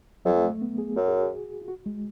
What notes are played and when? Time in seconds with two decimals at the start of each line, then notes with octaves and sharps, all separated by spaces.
0.25 F2 F#3
0.37 A3
0.50 A3
0.62 B3
0.78 G#4
0.96 F#2 F#4
1.08 G#4
1.15 F#4
1.62 F4
1.68 F#4
1.86 G#3